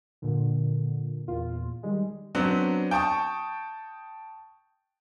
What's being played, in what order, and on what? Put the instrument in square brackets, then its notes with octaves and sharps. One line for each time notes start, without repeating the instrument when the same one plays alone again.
[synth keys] A#2 D3
E2 A#2 F4
D#3 G3 G#3
[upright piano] F#3 B3 C4 D4
G5 A5 C#6 D#6